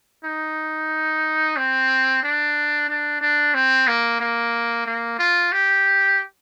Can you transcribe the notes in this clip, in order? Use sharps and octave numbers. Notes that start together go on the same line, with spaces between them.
D#4
C4
D4
D4
D4
C4
A#3
A#3
A#3
F4
G4